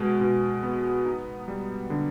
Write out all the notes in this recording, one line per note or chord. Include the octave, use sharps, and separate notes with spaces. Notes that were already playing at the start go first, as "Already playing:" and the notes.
Already playing: B2 G#3
B2
B3
D#4
G3
D3